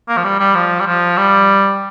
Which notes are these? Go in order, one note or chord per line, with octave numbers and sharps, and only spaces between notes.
A#3
F3
G3
G3
F3
G3
F3
G3